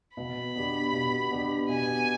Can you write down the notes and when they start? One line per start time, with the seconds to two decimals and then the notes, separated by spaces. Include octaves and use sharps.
0.17 B2 B5
0.55 B3 D4 G4
0.93 B2
1.31 B3 D4 G4
1.69 B2 G#5